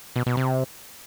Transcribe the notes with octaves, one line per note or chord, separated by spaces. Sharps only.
B2
B2
C3